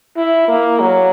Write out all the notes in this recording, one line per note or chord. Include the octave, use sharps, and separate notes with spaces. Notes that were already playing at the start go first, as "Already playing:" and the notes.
E4
A#3
F#3